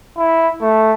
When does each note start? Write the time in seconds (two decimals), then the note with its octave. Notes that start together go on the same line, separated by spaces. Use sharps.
0.17 E4
0.61 A3